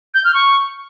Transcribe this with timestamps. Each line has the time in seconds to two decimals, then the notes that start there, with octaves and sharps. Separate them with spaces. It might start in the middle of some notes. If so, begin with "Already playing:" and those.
0.14 G6
0.24 F6
0.34 C#6